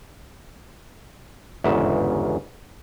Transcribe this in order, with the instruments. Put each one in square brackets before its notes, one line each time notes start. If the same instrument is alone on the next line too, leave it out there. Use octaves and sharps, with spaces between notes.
[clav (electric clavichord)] G1 E2 G#2 C#3 E5